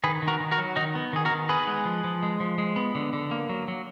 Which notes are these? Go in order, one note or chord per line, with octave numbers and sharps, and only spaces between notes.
D#3 G#4 B4
D#3
F#4 A#4
D#3
F#4 A#4
F#3
D#3 D#4 F#4
B3
D#3 G#4
F#4 A#4
D#3
B3 G#4 B4
G#3
F3
F3
G#3
F3
G#3
B3
D3
D3
A#3
F#3
F#3